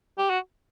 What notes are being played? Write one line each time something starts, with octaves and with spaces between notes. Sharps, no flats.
G4
F#4